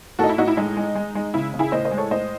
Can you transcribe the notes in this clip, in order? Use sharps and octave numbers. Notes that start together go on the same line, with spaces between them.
A2 D#4 F#4 A4
E4
A2 D#4 F#4
E4
G#3 D#4
G#3
G#3
G#3
C#3 E4
C#3
E4 G#4
A2 C5 D#5
C5 D#5
G#3
A4 C#5
A2 C5 D#5